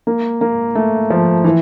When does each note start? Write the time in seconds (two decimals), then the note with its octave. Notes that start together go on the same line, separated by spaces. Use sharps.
0.07 A#3
0.41 A#3
0.75 A3
1.10 F3
1.44 E3